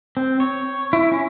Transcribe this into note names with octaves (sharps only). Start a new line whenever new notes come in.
C4
C#5
E4
C#4